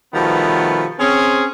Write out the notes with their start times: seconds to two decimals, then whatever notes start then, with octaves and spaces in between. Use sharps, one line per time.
0.13 B2 D#3 F3 G3 A3 B3
0.99 C4 C#4 G#4